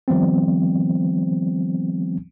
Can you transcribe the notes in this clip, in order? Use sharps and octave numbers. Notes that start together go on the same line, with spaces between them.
D#3 F3 G3 B3 C4